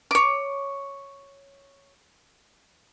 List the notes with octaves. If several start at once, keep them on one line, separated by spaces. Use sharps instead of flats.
C#5 D6